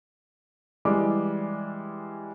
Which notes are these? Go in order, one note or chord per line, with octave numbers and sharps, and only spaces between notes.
E3 G3 G#3 D5 D6